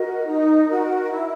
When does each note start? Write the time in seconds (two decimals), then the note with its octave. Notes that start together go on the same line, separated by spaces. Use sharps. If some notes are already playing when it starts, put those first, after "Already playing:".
Already playing: F#4 A#4 D#5
0.27 D#4
0.68 F#4 A#4 D#5
1.11 E4